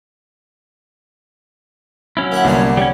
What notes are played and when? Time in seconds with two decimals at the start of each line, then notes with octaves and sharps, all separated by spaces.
2.17 F#3 C#4 E4
2.32 A#3 E5 F#5
2.44 C2 D3 A#3 B3 F4
2.77 G3 C#4 C#5